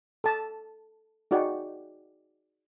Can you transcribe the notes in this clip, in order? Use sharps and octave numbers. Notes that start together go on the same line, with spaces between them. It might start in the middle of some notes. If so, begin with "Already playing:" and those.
A4 A5
D#4 F#4 G#4 D5 F#5 G5